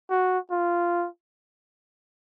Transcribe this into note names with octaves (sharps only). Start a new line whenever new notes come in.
F#4
F4